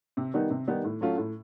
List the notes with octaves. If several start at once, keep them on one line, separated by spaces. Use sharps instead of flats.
C3
D#3 G3 B3 D#4
C3
D#3 G3 B3 D#4
A2
F#3 A3 C#4 F4
A2